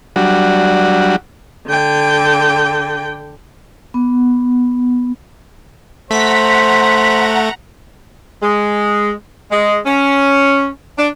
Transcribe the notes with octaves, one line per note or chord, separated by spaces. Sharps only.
F#3 G3 D4 F#4
D3 G5
B3
A3 C5 F#5 A#5 B6
G#3
G#3
C#4
D4